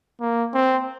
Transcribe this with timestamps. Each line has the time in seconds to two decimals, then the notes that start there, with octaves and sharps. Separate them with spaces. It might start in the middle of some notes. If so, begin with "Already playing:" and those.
0.21 A#3
0.54 C4